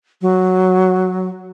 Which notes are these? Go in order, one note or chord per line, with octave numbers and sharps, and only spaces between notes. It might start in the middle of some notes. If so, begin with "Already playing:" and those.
F#3